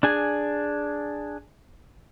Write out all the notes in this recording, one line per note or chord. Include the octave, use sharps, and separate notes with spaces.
D4 G#4 G#5